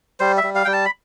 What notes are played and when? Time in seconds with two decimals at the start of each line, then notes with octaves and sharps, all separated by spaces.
0.20 G3 C5
0.37 E5
0.43 G3
0.55 F5
0.65 G3 G5
0.73 A5
0.85 B5